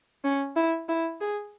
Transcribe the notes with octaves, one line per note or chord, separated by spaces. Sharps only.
C#4
E4
E4
G#4